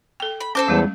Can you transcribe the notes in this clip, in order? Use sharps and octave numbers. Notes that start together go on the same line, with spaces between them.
A4 G5
B5
C#4 A4 C5 D6
E2 G3 G#3